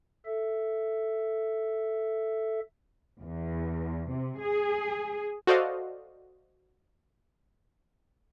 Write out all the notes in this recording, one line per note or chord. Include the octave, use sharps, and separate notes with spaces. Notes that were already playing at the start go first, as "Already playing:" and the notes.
A4 E5
E2
C3
G#4
F#4 A4 C5 D5 D#5 F5